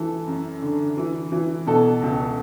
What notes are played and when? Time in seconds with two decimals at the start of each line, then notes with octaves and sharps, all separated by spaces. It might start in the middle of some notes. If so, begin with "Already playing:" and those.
Already playing: E3 A4
0.27 F#2
0.62 D3
0.97 E3
1.32 E3
1.67 B2 A4
2.02 C#2